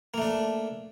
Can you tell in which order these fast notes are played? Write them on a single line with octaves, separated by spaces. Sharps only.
A#3 A3 D4